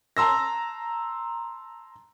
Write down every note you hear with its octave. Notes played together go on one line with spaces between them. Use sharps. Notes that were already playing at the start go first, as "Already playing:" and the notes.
A5 A#5 C6 E6 A#6